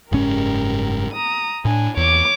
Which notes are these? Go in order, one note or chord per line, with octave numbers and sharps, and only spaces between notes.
F#1 G#2 C#4 G4 A#4
A#5 D#6
A2 D4 G#5
E2 C#5 D6